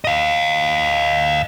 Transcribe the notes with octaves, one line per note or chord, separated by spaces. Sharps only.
D#5 F5